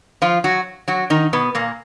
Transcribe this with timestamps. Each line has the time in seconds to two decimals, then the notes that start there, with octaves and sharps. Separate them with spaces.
0.22 F3 F4
0.44 F#3 F#4
0.88 F#3 F#4
1.10 D#3 D#4
1.33 B2 B3
1.55 A#2 A#3